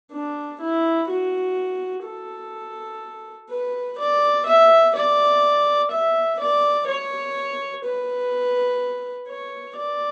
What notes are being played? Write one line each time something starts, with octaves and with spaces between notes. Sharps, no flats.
D4
E4
F#4
A4
B4
D5
E5
D5
E5
D5
C#5
B4
C#5
D5